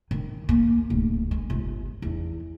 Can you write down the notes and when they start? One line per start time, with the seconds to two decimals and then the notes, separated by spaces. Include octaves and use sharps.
0.11 D#3
0.49 A#3
0.90 D1
1.31 G#3
1.50 G1
2.02 E2